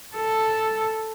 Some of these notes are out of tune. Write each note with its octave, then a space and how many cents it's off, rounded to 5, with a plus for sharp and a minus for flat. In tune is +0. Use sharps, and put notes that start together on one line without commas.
A4 +0